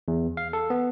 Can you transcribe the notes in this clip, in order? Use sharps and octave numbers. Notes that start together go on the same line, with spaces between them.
E2
F5
A4
B3